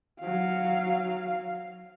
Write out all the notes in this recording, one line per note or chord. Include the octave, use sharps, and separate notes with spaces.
F#3 F5